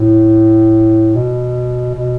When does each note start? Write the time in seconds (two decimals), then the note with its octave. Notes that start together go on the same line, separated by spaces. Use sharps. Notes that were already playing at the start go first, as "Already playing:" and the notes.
Already playing: A2
1.15 B2
1.95 B2